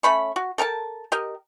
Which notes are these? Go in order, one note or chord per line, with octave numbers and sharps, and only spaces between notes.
A3 C#4 B5 C#6
F#4
A4 A#4 G5 A5
G4 A#4 D#5